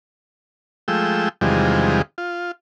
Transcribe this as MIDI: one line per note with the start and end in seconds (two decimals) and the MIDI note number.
0.88 1.29 53
0.88 1.29 56
0.88 1.29 57
0.88 1.29 79
0.88 1.29 88
1.41 2.02 40
1.41 2.02 48
1.41 2.02 51
1.41 2.02 53
1.41 2.02 55
1.41 2.02 56
2.18 2.51 65